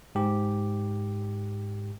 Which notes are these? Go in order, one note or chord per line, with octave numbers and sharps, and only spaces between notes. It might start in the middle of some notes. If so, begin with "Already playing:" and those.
G#2 G4